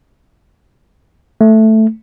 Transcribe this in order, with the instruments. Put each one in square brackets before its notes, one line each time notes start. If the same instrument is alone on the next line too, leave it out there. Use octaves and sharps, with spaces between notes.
[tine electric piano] A3